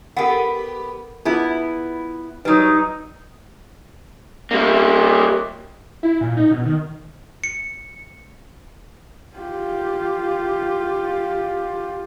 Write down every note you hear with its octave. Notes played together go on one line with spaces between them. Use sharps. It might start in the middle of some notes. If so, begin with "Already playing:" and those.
B3 G4 A4 A#4 F#5
B3 E4 F4 G#4 A5
F#3 G3 D#4 B4
G3 A#3
E4
A#2
D#4
B2
D#3
C#7
F4 G4